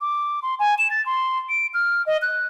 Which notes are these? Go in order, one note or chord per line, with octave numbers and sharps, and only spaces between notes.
D6
C6
G#5
E7
A6
C6
D7
F6
D#5
F#6